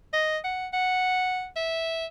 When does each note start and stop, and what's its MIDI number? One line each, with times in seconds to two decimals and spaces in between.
0.13 0.38 75
0.44 0.67 78
0.73 1.47 78
1.56 2.06 76